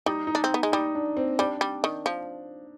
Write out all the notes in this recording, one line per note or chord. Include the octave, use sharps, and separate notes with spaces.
G3 D#4
D#4
D4
C4
B3
G#3
G3 D#4
D4
C4
G3 D4
G3
D#3
F3